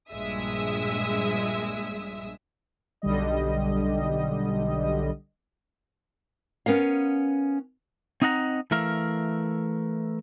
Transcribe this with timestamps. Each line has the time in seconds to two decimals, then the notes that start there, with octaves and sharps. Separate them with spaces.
0.11 A#1 G2 G#3 E5 D#6 E6
3.02 B1 D3 G3 D#5
6.66 B3 C#4 A#4 F5
8.22 C4 D#4 D#5 F#5 A#5
8.71 E3 A3 A#4 E5 F5